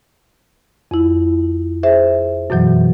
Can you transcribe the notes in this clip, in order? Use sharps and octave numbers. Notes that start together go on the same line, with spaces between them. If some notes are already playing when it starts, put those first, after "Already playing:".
F2 E4
G#4 C5 E5
F#2 B2 E3 F#3